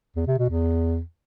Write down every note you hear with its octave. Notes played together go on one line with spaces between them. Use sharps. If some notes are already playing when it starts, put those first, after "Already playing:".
E2
C3
B2
E2